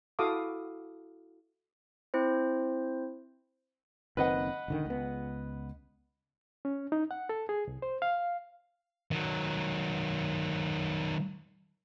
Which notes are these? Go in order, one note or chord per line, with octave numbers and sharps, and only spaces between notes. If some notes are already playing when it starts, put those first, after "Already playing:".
E4 F#4 A4 F5 D6 D#6
C4 E4 C5
F#1 D#3 C4 B4 D#5 F#5
E1 D3 D#3
C#2 B3
C#4
D#4
F#5
A4
G#4
C2
C5
F5
D#3 F#3